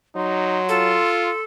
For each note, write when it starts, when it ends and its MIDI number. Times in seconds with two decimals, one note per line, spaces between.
0.16 1.00 54
0.16 0.63 63
0.16 1.40 84
0.69 1.31 65
0.69 1.44 69